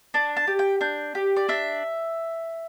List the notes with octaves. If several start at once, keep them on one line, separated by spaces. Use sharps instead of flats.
D4 A5
A5
G4
G5
D4 G6
G4
D5
D4 E5